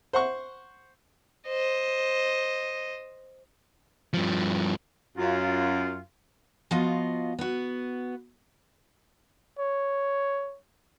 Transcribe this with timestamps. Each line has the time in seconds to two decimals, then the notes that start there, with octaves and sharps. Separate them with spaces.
0.13 C5 F#5 C#6
1.48 C5 D#5
4.14 G2 F3
5.18 F#2 F4
6.71 F3 B3 F4 F#4 D#5 F5
7.39 B3 F#4
9.59 C#5